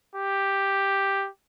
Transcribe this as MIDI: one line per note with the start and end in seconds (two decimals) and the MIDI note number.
0.15 1.28 67